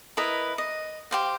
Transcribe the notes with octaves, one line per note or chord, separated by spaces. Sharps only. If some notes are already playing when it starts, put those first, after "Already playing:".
E4 A#4 B4 D#5
D#5
G4 C5 F5